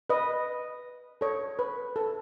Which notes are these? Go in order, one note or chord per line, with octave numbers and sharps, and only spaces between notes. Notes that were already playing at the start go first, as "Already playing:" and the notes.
B4 D#5
A4 C#5
B4
A4